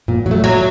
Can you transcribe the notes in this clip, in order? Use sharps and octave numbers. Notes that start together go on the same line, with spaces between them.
A#2
F#3
A3
A#2 F#3